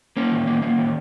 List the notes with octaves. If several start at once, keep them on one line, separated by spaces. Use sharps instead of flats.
A#3 C#4
D#3
A#3
A#3
D#3